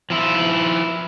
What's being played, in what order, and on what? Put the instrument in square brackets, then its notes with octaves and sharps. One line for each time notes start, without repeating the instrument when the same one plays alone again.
[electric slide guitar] F3 E4